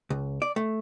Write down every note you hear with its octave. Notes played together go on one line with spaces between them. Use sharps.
C#2
D5
A3